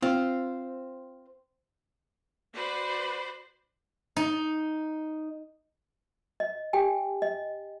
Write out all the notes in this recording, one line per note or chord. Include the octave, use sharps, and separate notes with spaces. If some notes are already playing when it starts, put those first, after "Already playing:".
C4 F4
F#4 B4 C5 D5 B5
D#4
D#5
G4 G5 G#5
D#5